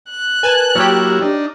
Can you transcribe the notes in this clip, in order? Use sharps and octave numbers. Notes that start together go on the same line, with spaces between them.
F#6
A#4 B4 G#5 A5
F#3 A#3 E4 G4 C#5 F6 A6
D4 D#4